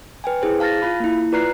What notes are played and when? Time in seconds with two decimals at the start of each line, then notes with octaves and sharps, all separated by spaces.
0.24 B4 G5 G#5
0.42 E4 G#4 C5
0.60 F5 A5 F6 A6 A#6
0.82 F4 F5 B5
1.00 A#3 E4
1.32 F4 B4 D5 A#5 F#6 C7